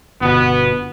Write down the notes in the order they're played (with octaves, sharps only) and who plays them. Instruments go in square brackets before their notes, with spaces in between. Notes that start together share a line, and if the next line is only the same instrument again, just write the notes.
[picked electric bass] G1 B2 [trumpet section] B3